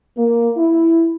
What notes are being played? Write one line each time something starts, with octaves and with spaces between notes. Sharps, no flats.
A#3
E4